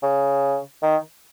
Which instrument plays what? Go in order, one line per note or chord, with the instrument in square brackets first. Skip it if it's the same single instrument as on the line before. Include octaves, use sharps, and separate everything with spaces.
[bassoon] C#3
D#3